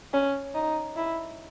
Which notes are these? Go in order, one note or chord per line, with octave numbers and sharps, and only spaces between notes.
C#4
D#4
E4